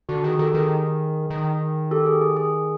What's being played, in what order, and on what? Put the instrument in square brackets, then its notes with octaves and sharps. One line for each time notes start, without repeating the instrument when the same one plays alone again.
[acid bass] D3 [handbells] F#4
[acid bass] D#3 [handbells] G#4
[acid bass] D#3 [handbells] G4 A4
[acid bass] D#3 [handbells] G#4 A#4
[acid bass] D#3
[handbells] G4 A4
G#4
G#4
G#4